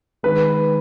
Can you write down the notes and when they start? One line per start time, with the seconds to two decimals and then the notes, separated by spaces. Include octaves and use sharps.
0.23 D#3 G#3 B4